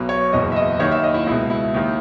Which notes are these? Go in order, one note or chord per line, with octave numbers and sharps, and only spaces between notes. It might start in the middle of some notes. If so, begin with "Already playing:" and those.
Already playing: B1 B2
C#5
F#1 E2 B2 D#5
E5
D#5
D#2 D#3 C#5
E5
D#5
E4
C#2 B2 E4
E4
D#2 D#3